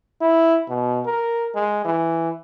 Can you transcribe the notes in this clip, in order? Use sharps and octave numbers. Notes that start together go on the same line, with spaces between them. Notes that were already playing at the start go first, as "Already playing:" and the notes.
E4
B2
A#4
G#3
E3